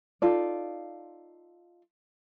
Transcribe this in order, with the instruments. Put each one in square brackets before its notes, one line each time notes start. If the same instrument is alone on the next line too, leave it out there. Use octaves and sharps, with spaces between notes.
[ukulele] D#4 F4 A4 D5